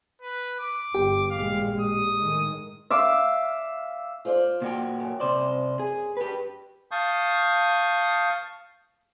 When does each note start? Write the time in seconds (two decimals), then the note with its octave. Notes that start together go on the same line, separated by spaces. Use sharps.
0.22 B4
0.59 D6
0.95 G1 G4
1.31 A1 A#2 G#3 F5
1.81 D#6
2.18 A2 D#3 G#3
2.90 E5 F5 D6
4.25 F4 C5 D5
4.62 A#2 F#4 G5
5.00 F#2
5.20 C3 C5 D5
5.79 G#4
6.17 G4 B4
6.91 F5 A5 C#6 D#6 G6